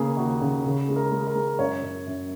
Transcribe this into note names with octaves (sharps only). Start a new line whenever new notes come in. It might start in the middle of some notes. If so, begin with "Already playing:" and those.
Already playing: C#3 A#3 G#4
D#2 F#4
C#3
C#3
G#3
A#4
G#3
A#4
G#3
F#2 C#5
F#2
F#2